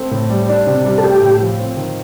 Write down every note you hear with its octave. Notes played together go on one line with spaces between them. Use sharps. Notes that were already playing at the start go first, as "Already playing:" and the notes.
Already playing: A3 C4
A2
G3
D4
C3
G3
A4
A3 G4
A2
F3
C4
D#3